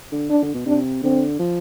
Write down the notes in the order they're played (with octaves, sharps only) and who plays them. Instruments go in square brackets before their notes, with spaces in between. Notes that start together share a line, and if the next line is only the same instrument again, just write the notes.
[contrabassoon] D3
[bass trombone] D4
[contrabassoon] D3
B2
[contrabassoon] C3 [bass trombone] D4
[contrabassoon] D3 [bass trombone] C4
[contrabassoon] F3